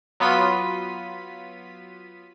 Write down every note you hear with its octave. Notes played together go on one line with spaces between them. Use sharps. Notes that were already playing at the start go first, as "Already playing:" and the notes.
F#3 B3 F4 B6 D#7